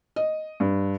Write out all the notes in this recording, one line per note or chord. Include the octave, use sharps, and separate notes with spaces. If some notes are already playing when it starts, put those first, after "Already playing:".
D#5
G2